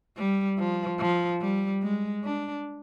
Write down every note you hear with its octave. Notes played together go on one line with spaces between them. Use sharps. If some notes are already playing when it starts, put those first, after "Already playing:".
G3
F3
F3
G3
G#3
D4